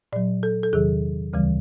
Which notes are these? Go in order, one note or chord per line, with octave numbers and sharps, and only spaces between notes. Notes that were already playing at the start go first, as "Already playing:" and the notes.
A#2 F#3 D5
A4
A4
E2 C3 D#3 F#3 G#4
D2 C#3 E3 G3